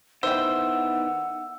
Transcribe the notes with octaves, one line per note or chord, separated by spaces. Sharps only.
D#3 B3 E4 C5 F#5 G5 E6